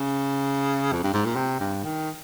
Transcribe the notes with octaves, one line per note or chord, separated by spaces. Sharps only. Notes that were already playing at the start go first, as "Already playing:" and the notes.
Already playing: C#3
F2
G2
G#2
A#2
C3
G2
D#3